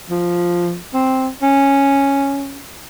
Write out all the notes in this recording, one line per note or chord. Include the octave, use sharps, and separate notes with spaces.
F3
C4
C#4